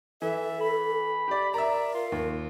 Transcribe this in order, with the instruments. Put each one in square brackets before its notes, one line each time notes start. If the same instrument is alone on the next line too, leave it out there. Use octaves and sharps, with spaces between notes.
[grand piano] E3 [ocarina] A4 [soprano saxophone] E5
[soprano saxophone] B5
[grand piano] G4 D5
[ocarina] A#4 [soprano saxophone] D5 [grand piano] E5 A#5
[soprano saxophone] F4
[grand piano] D#2